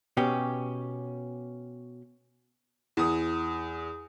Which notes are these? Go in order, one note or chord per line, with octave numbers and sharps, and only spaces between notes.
B2 C#4 G4
E2 D#6